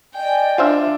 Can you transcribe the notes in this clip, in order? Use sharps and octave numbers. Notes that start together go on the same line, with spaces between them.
D5 D#5 G5 G#5
D4 F4 C5 E5